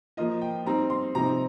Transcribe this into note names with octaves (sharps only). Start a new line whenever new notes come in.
F3 A#3 F4 D#5
G5
G3 C4 D#4 A#5
C6
C3 F3 C4 D#4 A#5